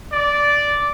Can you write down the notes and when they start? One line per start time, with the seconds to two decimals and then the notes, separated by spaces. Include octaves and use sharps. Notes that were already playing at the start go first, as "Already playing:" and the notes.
0.12 D5